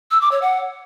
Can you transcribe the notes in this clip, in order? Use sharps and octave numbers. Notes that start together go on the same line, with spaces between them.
E6
D6
C#5
F#5